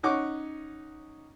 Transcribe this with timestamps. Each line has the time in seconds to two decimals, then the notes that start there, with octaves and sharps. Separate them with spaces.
0.03 C#4 D#4 F#5 C#6 D6